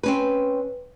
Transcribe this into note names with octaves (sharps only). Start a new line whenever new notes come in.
C4 C#4 B4